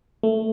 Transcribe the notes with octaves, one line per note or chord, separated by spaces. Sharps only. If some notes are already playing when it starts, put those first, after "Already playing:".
A3